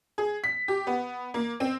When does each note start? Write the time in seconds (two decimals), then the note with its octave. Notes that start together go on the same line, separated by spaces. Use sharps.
0.18 G#4
0.44 B6
0.68 G4
0.87 B3
1.34 A#3
1.60 C4